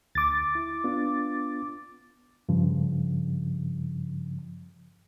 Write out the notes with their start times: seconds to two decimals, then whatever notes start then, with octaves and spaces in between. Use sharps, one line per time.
0.15 D2 D6 A6
0.55 E4
0.84 B3 D4 F4
2.49 G2 C#3 F3